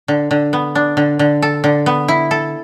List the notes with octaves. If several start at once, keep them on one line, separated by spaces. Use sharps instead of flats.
D3
D3
B3
D4
D3
D3
A4
D3
B3
E4
A4